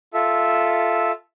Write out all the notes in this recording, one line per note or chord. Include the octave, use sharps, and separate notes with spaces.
F4 A4 E5